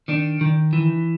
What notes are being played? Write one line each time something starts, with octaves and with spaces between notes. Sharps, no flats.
D#3 D4
D#3
E3